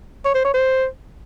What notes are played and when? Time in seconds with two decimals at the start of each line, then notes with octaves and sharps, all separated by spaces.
0.25 C#5
0.35 C5
0.44 C#5
0.54 C5